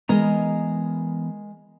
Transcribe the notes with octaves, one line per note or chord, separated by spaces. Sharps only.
E3 G#3 B3 A#4 D#5 A#5